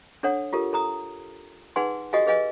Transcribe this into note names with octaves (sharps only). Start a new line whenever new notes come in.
D4 A4 C#5 F#5
F4 G4 A4 A#4
A4 A#5 D#6
D#4 G#4 B4 F#5 G#5 C6
F#4 G4 A4 D#5 F5 G#5
G#4 B4 D#5 F5 G#5